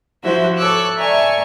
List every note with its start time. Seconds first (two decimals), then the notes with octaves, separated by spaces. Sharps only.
0.24 F3 E4 F#4 C5 E5
0.57 A4 C#5 C#6 D6 E6 F#6
0.97 A4 D5 E5 G#5 A#5 C#6